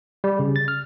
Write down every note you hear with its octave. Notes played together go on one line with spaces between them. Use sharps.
G3
C#3
A6
F6